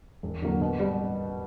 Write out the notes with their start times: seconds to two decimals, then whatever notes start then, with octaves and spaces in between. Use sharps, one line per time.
0.23 E1
0.42 E2 D3 F#3 A#3
0.61 B2
0.80 G3